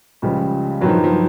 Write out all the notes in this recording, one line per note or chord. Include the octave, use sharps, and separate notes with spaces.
C#2 C#3 F3 G3
G2 D#3 F#3
F3
F3